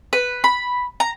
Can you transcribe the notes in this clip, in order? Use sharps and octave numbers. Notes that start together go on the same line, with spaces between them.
B4
B5
A#5